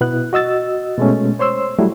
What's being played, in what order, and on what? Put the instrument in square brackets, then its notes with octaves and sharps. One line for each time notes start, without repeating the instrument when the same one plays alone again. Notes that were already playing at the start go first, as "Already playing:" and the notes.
[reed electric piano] B2 B3 E4 F#6
F#4 D#5 E6 A6
B2 G#3 A3 C#4
C5 C#5 C6 E6
F#3 G3 A3 E4